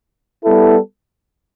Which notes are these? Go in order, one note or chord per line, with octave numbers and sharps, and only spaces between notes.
G3 B3 E4 A4